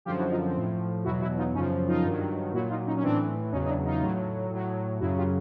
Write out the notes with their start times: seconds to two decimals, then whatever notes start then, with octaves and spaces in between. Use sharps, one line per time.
0.05 F#2 D3 F3 F4 G4
0.18 E4 F#4
0.31 D#4 F4
0.44 C4
0.56 A2 F3
1.04 E2 B2 F#3 E4 F#4
1.21 E4 F#4
1.37 D#4 F4
1.54 F#2 C#3 F3 C#4 D#4
1.88 D#4 F4
2.04 G2 D#3 F#3
2.53 A#2 F#3 E4 F#4
2.70 D#4 F4
2.87 C#4 D#4
2.97 C#4
3.03 A2 E3 C4 D4
3.52 E2 C#3 F#3 C#4 D#4
3.65 D#4
3.68 D4 E4
3.85 D#4 F4
4.01 A2 F#3
4.51 A2 F#3
5.00 F#2 C#3 F#3 E4 F#4
5.18 F4 G4